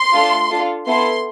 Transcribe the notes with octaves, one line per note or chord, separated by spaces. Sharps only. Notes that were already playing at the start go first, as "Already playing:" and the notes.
Already playing: C6
A3 D4 F4 A4
D4 F4 A4
B3 E4 A4 C6